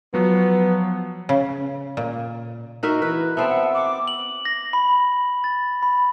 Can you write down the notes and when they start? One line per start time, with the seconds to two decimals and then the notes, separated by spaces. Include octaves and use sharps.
0.14 F3 F#3 B3
1.29 C#3
1.97 A#2
2.83 D#4 F#4 A#4 E5
3.02 E3 B4
3.37 B3 C4 E5 A5
3.49 F#5
3.74 D6
4.08 F#7
4.45 A#6
4.73 B5
5.44 A6
5.83 B5